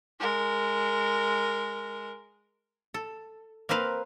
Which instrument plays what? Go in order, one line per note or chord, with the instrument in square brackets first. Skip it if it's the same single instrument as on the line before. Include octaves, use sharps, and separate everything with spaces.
[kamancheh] G#3 A#4
[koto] A4
A#3 C4 A#4 B4 F5